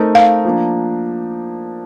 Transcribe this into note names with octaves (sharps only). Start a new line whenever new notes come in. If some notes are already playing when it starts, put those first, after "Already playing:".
Already playing: A3 C4 D#4 A#4
F5
F3 A#3 D4